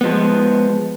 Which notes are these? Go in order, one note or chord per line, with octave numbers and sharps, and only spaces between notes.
F3 G#3 B3